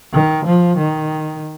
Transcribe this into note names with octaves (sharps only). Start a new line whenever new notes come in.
D#3
F3
D#3